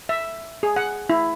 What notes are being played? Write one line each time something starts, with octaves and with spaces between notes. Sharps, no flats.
E5
G#4
F#5
E4